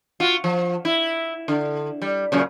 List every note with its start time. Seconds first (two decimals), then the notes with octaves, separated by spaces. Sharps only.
0.20 F4 F#4
0.44 F3
0.85 E4
1.48 D3
2.02 G3
2.32 F#2 A#2 C#3